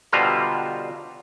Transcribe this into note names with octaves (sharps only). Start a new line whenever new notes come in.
B2 D3 G3 F4 C5 A#5